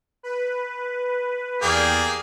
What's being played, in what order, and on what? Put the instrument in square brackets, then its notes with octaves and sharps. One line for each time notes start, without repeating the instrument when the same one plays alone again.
[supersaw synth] B4
[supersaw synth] E2 D5 G5 [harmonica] A#3 G4 G#4